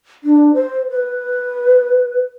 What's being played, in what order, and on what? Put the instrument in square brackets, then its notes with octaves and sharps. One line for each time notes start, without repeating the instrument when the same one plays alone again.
[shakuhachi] D4
C5
B4